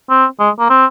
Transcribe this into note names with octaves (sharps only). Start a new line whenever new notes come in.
C4
G#3
A#3
C4